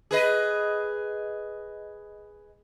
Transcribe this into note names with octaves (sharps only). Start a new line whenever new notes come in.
G#4 B4 D#5